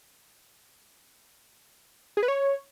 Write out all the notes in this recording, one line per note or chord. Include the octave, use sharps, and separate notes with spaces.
G#4
B4
C#5